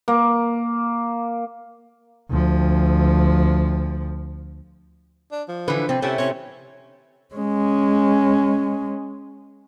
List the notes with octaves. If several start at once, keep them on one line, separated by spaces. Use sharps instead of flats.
A#3
D2 F3
D4
F3
D3 E3 B4
C3 C4
C3 A3 C#4 E4 G5
C3 C#4 C#5
G#3 C#4